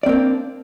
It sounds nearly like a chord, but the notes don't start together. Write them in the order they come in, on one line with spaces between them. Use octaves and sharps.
D5 C4 A#3 D4